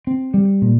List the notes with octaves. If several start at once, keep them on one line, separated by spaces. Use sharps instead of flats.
C4
G3
A#2